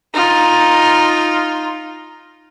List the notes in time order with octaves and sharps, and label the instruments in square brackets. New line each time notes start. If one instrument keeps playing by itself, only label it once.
[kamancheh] D#4 F4